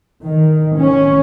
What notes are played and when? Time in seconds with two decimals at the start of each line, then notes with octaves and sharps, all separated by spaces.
0.23 D#3
0.78 C#4